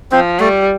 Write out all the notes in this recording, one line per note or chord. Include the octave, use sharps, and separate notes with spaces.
F3 C4
G3 A3